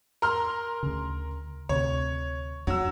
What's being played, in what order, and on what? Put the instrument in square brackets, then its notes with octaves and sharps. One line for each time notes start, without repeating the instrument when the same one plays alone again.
[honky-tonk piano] A#4 C6 F6
[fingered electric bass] D2 C#3
[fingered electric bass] D2 C3 [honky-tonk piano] C#5
[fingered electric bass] G#1 F2 D4 [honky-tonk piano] F#3 E6